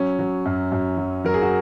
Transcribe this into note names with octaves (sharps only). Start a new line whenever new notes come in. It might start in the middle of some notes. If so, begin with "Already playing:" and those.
Already playing: F#3 C#4
F#3
F#2
F#2
F#3
F#3 A#4
G#4
F#4